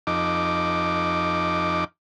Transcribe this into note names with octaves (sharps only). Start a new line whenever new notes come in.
F2 D#4 D6